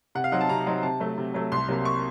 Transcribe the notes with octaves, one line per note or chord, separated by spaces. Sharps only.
C3 F#5
F5
F#3 C4 D#4 F#5
A5
C3 A#5
F#3 C4 D#4
C3 A5
F#3 A3
C3
F#3 A3
C2 C6
C3 F#3 A#3
C#6